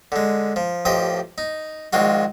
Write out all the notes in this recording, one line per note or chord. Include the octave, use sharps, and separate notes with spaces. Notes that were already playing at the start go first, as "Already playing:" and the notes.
D3 G#3
F3
A1 F3 G4 D#5
D#4
A#1 D#3 G#3 F4 F#4